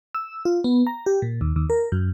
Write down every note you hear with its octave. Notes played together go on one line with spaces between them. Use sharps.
E6
F4
B3
A#5
G4
A#2
D#2
D#2
A#4
F#2